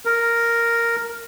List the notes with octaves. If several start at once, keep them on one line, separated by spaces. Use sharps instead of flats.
A#4